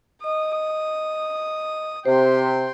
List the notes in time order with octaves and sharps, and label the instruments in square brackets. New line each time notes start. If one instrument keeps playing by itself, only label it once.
[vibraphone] D#5 [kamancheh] D#6
[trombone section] C3 [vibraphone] G4 [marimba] C5 [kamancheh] G5 C6